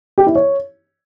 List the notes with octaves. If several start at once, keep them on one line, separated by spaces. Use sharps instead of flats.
G4
E4
C#5